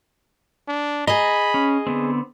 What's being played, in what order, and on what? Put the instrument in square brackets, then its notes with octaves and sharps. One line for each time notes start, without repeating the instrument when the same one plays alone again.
[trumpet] D4
[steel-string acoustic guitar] G#4 D#5 [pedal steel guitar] A#5 [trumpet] B5
[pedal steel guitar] C#4
D3 B3 C4